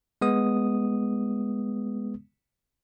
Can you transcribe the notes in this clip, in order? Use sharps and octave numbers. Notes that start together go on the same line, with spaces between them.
G#3 B3 D#6